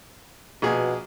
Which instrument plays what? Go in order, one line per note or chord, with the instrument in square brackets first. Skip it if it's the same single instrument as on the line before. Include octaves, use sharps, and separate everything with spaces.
[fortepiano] A#1 G#4 [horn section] B2